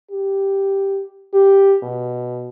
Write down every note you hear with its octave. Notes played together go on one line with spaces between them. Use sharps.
G4
G4
B2